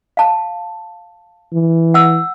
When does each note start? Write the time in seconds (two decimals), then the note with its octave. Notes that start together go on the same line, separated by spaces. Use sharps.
0.17 F5 A5
1.53 E3
1.94 F#5 E6